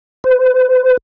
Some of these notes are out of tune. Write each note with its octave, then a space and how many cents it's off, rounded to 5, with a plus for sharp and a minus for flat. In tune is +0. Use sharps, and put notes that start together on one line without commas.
C5 -45